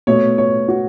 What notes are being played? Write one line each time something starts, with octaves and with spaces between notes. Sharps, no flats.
B2 A3 C#5
C#5
F#4